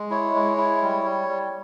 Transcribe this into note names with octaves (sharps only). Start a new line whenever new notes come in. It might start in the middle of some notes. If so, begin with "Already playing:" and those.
Already playing: G#3
E4 C#5
G#3
E4
G3
G3
G3